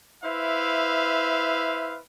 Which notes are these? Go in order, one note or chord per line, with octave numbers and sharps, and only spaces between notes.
E4 B4 C5 E5 F5